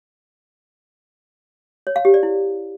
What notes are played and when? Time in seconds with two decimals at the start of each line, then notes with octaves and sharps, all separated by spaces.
1.87 C#5
1.96 F5
2.05 G4
2.14 D5
2.23 E4